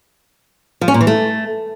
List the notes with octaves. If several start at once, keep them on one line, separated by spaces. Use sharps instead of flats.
F3
C#4
A#2
E3
A3